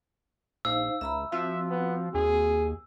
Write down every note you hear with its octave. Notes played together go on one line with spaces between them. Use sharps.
A#1 D#4 C5 F5 E6
C#2 E5 A#5 B5
F3 C4 F#4 E5
B3
D#2 G#4